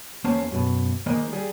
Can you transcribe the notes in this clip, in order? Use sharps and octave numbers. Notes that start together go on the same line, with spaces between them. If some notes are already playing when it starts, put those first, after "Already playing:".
E2 A#3 C#4 C5 C#5 A5
F#2 B2
D#3 G#3 A#3 C5 D#5
G3 G#4